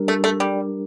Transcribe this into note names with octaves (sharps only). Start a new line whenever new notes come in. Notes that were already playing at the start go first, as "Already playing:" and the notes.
Already playing: G3 D4 G4 A#4
A3
A3
G3